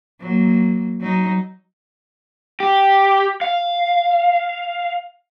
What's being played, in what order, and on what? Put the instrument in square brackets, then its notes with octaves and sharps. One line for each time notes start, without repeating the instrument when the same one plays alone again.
[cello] F#3 A#3
F#3 D#4
[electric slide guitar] G4
F5